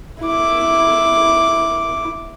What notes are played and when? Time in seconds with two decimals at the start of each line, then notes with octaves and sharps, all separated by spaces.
0.22 E4 D6